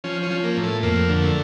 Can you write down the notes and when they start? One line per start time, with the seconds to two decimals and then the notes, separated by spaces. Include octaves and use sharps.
0.04 F3 C#4
0.23 C#4
0.31 F3
0.44 A#3
0.57 A2
0.63 A3
0.83 F2 A#3
1.09 D3
1.22 A3